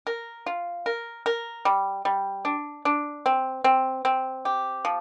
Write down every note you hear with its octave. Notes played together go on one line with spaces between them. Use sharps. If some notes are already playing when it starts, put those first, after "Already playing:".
A#4
F4
A#4
A#4
G3
G3
D4
D4
C4
C4
C4
G4
F3